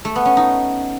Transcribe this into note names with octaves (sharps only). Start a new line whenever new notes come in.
A3
B3
C#4
D#4